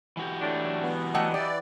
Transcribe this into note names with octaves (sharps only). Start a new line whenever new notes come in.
E3 F#4 G4
A2 A3 D4
B3
F#3 A3 D4 D#5 F#5 G5
E3 G4 D5